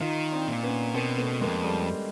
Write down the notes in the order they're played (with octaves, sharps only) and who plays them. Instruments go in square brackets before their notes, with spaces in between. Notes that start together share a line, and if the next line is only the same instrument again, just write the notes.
[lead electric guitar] D#3 [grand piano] D#4 F4
[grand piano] C4 D4
[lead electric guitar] A#2
[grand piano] B3 C#4
[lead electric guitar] B2 [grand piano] A#3 C4
[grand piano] A3 B3
[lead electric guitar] F2 [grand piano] G#3 A#3
[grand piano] G3 A3